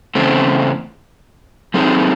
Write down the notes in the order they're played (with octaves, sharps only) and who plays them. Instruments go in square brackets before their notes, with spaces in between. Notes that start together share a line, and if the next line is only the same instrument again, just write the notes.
[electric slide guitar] E2 C#3 A3 C4
F#3 A3 C4 D#4 G#4